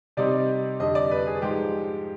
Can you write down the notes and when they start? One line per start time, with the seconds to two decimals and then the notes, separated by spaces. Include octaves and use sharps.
0.17 C3 G3 C4 D#4 D5
0.80 F2 D3 G3 D#5
0.95 D5
1.11 B4
1.27 G#4
1.42 G#2 F3 G#3 G4